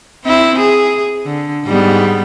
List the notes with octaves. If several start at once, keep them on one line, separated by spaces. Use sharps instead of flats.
C4 E4
G#4
D3
G#2 G3 B3